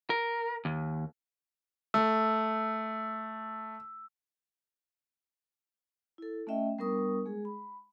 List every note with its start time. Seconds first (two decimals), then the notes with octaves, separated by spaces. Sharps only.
0.10 A#4
0.65 D#2
1.94 A3 E6
6.18 E4 A4
6.47 A3 C#4 D#5 E5 G5
6.79 G3 B3 D4 A#4 C#6 D#6
7.26 G#3 G#4
7.45 B5